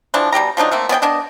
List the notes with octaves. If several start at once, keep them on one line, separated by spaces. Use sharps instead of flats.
E3 F3 D4
B2 G3 G4 A#5
F3 F#3 D4 D#4
A3 A#3 C4
B3 G#4 D5 G5
B3 D4 D#5